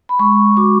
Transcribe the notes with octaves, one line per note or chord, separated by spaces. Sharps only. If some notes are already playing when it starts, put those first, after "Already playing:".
B5
G#3 C#6
F#4 D6